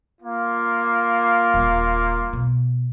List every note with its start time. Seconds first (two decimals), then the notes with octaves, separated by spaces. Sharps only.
0.22 A#3 F4
1.54 D#1
2.33 B2